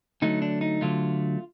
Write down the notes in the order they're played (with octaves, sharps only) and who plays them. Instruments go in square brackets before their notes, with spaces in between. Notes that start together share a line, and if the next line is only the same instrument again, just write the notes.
[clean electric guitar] D3 F#3 A3 D#4
D4
D#4
D3 F#3 A3 F4